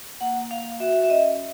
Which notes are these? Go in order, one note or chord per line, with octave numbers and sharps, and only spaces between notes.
A#3 F#5
A#3 F5
F#4 E5
E5
C#4 D#5